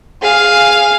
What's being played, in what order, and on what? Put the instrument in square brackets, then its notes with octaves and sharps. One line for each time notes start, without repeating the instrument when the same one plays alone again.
[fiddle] G#4 F5